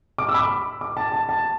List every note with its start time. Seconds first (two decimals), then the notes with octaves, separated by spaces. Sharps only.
0.18 D6
0.29 E6
0.34 B5
0.39 D6
0.81 D6
0.97 A5
1.12 A5
1.29 A5